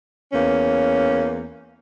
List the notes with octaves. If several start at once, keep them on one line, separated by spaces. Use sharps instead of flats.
E2 A#3 C#4